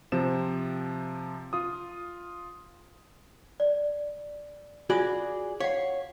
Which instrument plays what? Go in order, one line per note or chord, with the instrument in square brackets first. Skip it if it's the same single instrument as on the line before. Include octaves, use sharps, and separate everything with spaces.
[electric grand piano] C3 F3 C4 E7
F4 D#6
[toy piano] D5
[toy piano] F4 [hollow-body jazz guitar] F#4 G#4 D5
[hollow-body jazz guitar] C#5 [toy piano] F5 F#5